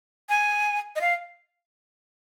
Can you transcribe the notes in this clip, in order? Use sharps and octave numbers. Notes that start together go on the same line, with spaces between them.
G#5
D#5
F5